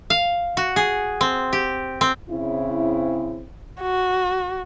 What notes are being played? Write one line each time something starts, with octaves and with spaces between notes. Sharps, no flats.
F5
F#4
G#4
C4
G4
C4
C#3 C4 E4
F#4